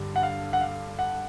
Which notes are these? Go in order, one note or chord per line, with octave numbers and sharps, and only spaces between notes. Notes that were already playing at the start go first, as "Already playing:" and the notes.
Already playing: G2 D3 G3
F#5
F5
F#5
F5
F#5